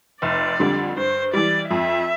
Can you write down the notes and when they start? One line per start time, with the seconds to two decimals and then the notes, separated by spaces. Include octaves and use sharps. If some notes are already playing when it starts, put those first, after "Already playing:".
0.22 F1 D5
0.60 F2 D3 G3
0.97 G2 C5
1.33 E3 G3 D5
1.71 F2 E5